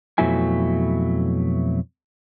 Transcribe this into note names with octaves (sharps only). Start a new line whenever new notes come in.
F2 B2 F#3 A3 E4 G#5